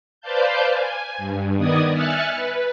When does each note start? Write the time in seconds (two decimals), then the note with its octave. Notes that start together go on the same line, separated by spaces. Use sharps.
0.21 B4 C5 D5 F5 A5 G6
0.70 G#5
1.18 G2
1.57 D#3 B3 D5 D#5 D#6 G#6
1.90 E5 G#5 F6 F#6 A6 C#7
2.33 B4